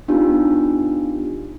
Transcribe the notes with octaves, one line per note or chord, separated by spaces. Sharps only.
B3 D4 D#4 F4 G4